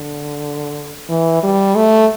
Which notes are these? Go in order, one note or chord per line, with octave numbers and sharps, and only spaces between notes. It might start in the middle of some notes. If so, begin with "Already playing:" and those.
Already playing: D3
E3
G3
A3